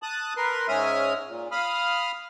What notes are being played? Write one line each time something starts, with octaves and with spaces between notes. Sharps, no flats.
A5 D#6 F#6
A#4 B4 C6
G#2 G#3 C#4 E5 D#6 F6
A#2
F5 B5 D#6 F6